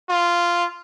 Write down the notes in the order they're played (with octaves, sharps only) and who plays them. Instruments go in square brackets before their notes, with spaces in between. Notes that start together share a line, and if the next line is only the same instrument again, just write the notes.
[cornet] F4